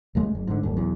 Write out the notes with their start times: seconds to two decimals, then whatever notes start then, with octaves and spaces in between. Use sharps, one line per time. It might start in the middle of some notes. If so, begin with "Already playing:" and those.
0.15 D#2 C#3 G#3 A3
0.35 F#1
0.47 G#2 D3
0.63 D1 G1
0.77 B1 E2